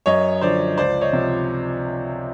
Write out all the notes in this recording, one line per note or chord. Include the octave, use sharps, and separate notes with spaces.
F#2 C#5 D#5
D3 F3 C5 D5
C#2 C5 D5
C#5 D#5
C3 F3